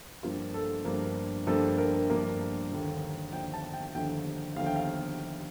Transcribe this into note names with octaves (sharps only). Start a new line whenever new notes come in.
G2 F3 A#3 F4
A4
G2 F3 A#3
G2 F3 A#3 A4
A#4
G2 F3 A#3
D#2 D3 F3
D#2 D3 F3 G5
A5
G5
D#2 D3 F3 G5
D#2 D3 F3 F5
G5
F5